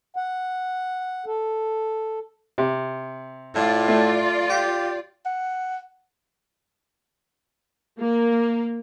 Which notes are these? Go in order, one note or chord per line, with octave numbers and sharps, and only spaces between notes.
F#5
A4
C3
A2 F4 D5
A3
G4
F#5
A#3